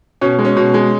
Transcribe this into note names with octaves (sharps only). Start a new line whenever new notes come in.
B2 C#4
G#3
C#4
B2
G#3